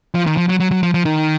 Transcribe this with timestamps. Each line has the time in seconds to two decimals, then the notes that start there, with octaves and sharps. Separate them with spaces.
0.15 F3
0.26 D#3
0.37 F3
0.49 F#3
0.60 F#3
0.71 F#3
0.83 F3
0.94 F3
1.05 D#3